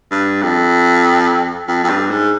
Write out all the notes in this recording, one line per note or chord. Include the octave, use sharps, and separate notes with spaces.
G2
F2
F2
F2
G2
G#2